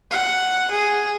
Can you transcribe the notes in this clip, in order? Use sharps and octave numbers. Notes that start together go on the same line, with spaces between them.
F#5
G#4